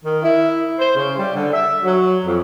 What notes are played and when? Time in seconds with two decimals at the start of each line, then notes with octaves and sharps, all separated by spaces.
0.04 D#3
0.23 E4
0.78 C5
0.96 C#3
1.18 G3
1.35 D3
1.53 E5
1.84 F#3
2.25 F2